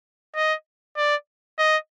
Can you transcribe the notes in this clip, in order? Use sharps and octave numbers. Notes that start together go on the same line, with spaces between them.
D#5
D5
D#5